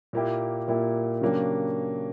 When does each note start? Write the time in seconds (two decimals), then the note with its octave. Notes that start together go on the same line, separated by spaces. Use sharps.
0.13 A#2 A#3 E4 G4
0.68 A#2 A#3 E4 G4
1.21 C#3 F#3 A#3 D4 G4